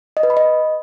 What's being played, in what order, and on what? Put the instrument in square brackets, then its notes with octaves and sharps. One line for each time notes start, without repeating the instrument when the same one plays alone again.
[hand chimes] D#5
B4
B5
D#5